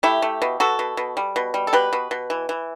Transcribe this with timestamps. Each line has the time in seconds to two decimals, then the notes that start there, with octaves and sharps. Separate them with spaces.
0.03 A3 E4 G4
0.22 A3
0.42 B2
0.60 B2 F#4 A4
0.79 B2
0.97 B2
1.17 G3
1.36 B2
1.54 G3
1.67 A4
1.73 B2 G4 B4
1.93 B2
2.11 B2
2.30 E3
2.49 E3